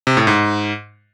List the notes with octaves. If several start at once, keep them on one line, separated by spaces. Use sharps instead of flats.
C3
A2
G#2